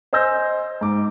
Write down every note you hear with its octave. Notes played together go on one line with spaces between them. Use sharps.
C5 D#5 G#5 E6 G6 A#6
G#2 D6